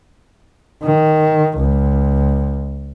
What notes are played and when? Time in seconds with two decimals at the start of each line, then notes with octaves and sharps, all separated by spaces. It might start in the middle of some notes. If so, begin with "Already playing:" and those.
0.84 D#3
1.59 C#2